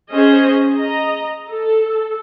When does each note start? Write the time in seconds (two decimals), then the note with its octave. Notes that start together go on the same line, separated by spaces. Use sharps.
0.11 C#4 G#4 C5 D#5
0.75 D#5 A#5
1.49 A4